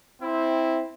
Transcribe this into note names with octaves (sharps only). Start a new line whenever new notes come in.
C4 E4